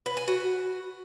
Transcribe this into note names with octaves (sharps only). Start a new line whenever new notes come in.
B4
G#5
F#4